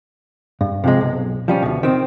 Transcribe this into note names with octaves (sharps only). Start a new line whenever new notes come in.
G2
C3 F3 G#3
B1
F3 G3 C#4
D2 B2
D#3 C4